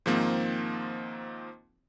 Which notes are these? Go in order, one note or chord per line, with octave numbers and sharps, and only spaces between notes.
G#2 D#3 F3 A#3 C4